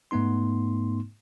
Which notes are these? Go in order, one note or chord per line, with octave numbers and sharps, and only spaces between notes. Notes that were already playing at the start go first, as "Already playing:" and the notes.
G#2 A3 B3 D#4 C6